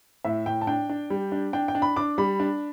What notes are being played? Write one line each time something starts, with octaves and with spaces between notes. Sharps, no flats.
A2 E5
A2 G5
A5
D4 G5
D4
G3
D4
D4 G5
G5
D4
B5
D4 D6
G3 B5
D4